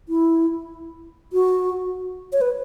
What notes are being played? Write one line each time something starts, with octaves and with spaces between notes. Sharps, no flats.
E4
F#4
C#5
B4